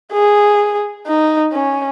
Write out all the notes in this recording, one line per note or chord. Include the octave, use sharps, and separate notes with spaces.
G#4
D#4
C#4